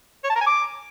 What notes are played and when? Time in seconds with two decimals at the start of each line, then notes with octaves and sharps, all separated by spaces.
0.24 C#5
0.30 A5
0.35 A#4
0.41 G#5
0.46 D6